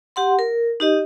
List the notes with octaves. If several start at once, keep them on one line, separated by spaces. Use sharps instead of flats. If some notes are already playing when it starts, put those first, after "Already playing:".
G4 F#5 C6
A#4
D#4 G4 D#5